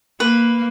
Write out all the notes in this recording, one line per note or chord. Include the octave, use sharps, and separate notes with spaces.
A#3 B4